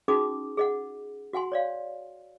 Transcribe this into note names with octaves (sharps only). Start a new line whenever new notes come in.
C#4 D#4 F#4 G#4 D6 D#6
G#4 D#5 F#5
F#4 F#5 G#5 C6
C#5 D5 F5